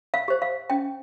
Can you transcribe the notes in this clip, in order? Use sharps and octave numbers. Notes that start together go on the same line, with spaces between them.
F5
G4 C5
F5
C#4 G5